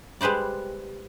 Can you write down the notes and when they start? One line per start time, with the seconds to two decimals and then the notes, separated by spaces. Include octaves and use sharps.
0.21 G3 G#3 B4 C5 D5